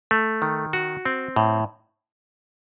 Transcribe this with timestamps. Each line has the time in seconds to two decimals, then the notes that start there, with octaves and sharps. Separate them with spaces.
0.11 A3
0.42 D#3
0.73 F#4
1.05 C4
1.36 A2